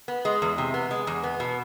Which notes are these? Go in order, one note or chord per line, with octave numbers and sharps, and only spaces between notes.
B3
G#3
E2
C3
B3
G#3
E2
B3
B2